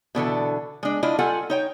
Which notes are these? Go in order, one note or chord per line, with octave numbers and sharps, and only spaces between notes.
B2 D3 E3 A4
G#3 D4
D4 E4 F4 D#5
G3 F4 A4 F#5 G#5
D#4 C#5 G5